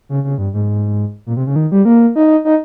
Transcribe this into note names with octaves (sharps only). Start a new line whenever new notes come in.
C#3
C#3
G2
G#2
A#2
C3
C#3
D#3
G3
A#3
D#4
D#4